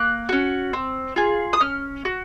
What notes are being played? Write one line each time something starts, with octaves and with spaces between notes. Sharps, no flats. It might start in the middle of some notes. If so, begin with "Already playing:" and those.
Already playing: A#3 F#6
C#4 F#4
C4
F4 G#4
D#6
C#4 F6
F#4